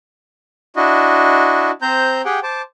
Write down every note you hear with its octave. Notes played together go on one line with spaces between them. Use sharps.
D4 E4 F#4 D#5
C4 C5 A#5 G6
G4 G#4 F#5 G5
C5 A5 D6